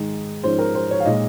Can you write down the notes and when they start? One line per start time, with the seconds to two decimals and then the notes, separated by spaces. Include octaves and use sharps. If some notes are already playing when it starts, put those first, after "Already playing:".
Already playing: G#2 D#3 G#3 D#4
0.43 G#2 F3 G#3 C#4 C5
0.59 A#4
0.75 C5
0.91 C#5
1.00 F5
1.05 A#2 G#3 D#4 D#5